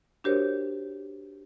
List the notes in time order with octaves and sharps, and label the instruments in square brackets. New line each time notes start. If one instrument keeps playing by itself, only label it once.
[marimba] D4 F#4 G4 A#4 C5 C#5